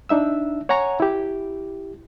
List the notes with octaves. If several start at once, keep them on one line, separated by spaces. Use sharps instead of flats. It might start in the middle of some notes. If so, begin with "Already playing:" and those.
D4 D#4 E5 E6
C#5 F#5 G#5 A#5 C#6
E4 G4